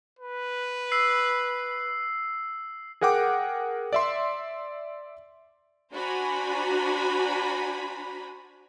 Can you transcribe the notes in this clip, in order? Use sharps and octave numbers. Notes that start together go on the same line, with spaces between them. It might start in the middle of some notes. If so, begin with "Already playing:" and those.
B4
E6 C7
G#4 A#4 F#5 G5 D6
D5 E5 C6
D4 F#4 C5 G#5 A#5 B5